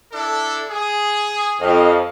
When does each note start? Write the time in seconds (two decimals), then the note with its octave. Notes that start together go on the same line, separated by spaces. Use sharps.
0.12 D4 E4 A4
0.70 G#4
1.61 F2 D#5 F5